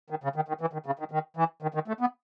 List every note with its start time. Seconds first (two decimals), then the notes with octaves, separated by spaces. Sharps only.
0.10 D#3
0.24 C#3
0.36 D#3
0.48 D#3
0.61 E3
0.73 D#3
0.86 C#3
0.99 D#3
1.11 D#3
1.37 E3
1.62 D#3
1.74 D#3
1.88 A3
2.01 B3